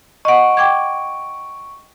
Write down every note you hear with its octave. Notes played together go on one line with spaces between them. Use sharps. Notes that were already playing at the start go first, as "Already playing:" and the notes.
D#5 F#5 C#6 D7
G5 D6 G#6